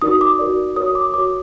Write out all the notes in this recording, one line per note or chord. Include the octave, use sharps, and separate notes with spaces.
D#4 F#4 A#4 D5 D#6
D6
D#4 F#4 A#4 D5
F#4 A#4 C#5 D#6
D6
F#4 A#4 C#5 D6